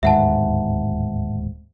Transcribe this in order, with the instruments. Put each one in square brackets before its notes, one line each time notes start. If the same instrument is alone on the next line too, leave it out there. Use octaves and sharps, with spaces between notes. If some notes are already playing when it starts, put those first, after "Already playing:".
[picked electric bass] D1 D#2 G#2 [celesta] E5 F#5 A5